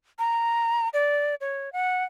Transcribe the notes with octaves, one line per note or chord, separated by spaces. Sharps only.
A#5
D5
C#5
F#5